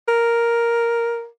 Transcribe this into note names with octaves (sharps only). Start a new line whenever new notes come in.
A#4